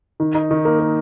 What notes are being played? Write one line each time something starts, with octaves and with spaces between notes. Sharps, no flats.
D#3
D#4
D#3
A#3
A#3